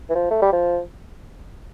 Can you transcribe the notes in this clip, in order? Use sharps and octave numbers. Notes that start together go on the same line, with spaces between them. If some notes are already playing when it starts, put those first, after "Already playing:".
E3
F3
A3
G3
F3